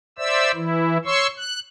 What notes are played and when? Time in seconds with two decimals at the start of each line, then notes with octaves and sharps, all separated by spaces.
0.18 C5 D5 E5 E6
0.55 E3 E4
1.05 C#5 C6 C#6 E6
1.37 F#6